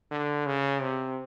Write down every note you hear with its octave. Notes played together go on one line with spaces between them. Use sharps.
D3
C#3
C3